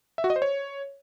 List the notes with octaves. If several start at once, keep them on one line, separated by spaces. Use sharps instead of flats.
E5
F#4
D#5
C5
C#5